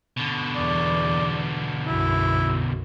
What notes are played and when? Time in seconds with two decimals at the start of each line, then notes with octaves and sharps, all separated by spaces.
0.17 B2 D3
0.56 E2 D5
1.87 B1 F#2 E4